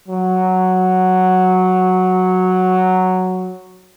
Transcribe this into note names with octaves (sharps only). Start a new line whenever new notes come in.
F#3